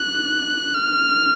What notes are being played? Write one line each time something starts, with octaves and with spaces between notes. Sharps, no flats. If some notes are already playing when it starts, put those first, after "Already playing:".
Already playing: F#6
F6